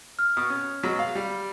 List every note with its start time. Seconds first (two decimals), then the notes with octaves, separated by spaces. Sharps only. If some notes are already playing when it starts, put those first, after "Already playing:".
0.19 F6
0.37 B2 D#6
0.50 C#4
0.83 B2 F#3 G#3
0.99 F5
1.15 G3